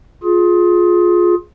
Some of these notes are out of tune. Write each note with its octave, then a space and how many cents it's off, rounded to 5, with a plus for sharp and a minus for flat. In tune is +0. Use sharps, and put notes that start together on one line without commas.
F4 +15 G#4 +15